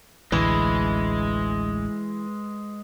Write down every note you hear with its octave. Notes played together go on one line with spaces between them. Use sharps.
A1 D2 E3 G#3